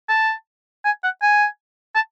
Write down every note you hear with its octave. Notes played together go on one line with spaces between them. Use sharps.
A5
G#5
F#5
G#5
A5